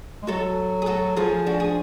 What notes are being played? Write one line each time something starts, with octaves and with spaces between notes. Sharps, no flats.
G#3
F#3 F#4 A4
G#4
F#4 A4
F3 F4 G#4
D4 F#4
G#4